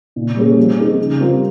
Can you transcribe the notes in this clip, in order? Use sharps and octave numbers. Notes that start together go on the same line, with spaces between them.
A#2
G3 A#3 C#4 G#4
F3
C4 D#4 G#4
C#3
G3 C4 F4 A#4